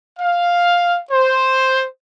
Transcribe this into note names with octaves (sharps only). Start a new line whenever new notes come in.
F5
C5